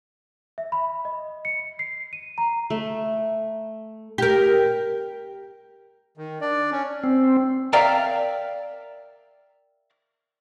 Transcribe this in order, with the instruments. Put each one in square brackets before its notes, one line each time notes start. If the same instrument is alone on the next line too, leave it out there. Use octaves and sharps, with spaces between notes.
[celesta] E5
B5
D#5
C#7
C7
D#7
A#5
[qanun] A3
[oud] G4 A#4
[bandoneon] D#3
D4 D5
C#4
[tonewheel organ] C4
[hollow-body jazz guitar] A#4 D5 E5 F5 G5 A#5